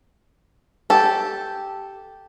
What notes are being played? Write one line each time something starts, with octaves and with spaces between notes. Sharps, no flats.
G4 A4